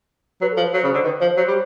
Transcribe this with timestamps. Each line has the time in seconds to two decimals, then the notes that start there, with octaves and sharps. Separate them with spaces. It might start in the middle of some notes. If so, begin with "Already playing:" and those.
0.41 F#3 B4
0.52 A4
0.57 F3
0.62 B4
0.73 F#3 C5
0.83 C#3 C5
0.94 D3 C5
1.04 D#3 B4
1.20 F3 C5
1.37 F#3 C5
1.48 G3